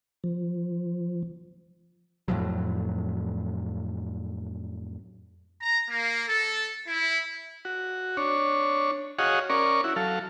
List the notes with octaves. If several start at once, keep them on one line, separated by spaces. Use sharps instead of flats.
F3
F2 A2 F3 F#3
A#5
A#3
A4
E4
F#4
D4 C#5
F#4 G#4 C#5 D#5 F5 F#5
C#4 A#4 D5 C#6
E4 F#4
F#3 A4 F5